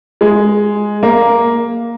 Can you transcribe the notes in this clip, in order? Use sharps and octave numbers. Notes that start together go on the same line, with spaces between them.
G#3
A#3